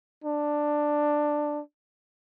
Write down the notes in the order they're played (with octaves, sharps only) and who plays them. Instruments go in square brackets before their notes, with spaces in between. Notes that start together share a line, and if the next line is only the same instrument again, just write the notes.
[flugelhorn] D4